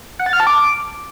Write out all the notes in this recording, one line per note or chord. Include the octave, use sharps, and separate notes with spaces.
F#5
A6
F6
A5
D6